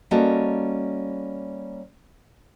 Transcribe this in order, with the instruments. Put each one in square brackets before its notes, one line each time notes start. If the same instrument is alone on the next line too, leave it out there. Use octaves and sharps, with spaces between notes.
[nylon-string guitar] G3 A#3 C#4 F#4 A4 D#5